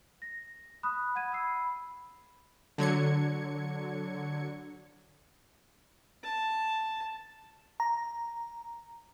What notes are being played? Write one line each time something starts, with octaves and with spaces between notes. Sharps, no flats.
A#6
B5 D#6 F#6
F#5 B5 G#6 D#7
B5 E6 C7
D3 F#3 G#6 C#7
A5
A#5